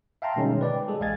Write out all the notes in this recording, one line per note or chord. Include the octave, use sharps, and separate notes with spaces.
E5 F5 G5 A5 A#5 C6
B2 D3 D#3 G3 G#3 C#4
B4 D5 G5
G#3 G#4 A4
A1 G#3 F5 G#5 G#6 A6